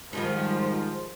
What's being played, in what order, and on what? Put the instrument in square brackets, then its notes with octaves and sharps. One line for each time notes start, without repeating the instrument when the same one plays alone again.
[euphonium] G#2 [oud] D#3 G3 D#4 [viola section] F3